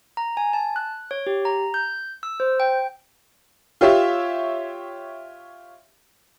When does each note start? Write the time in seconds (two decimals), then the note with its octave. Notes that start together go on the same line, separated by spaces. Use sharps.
0.17 A#5
0.37 G#5
0.53 A5
0.76 F#6
1.11 C#5
1.27 G4
1.45 A#5
1.74 G6
2.23 E6
2.40 C5
2.60 G5
3.81 F4 G4 C#5 E5